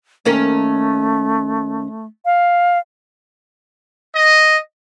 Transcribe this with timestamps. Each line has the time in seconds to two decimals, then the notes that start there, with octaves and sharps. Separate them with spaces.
0.25 D#2 A3 C#4 A#4
2.25 F5
4.16 D#5